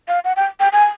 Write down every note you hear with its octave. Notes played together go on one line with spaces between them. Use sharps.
F5
F#5
G5
G5
G#5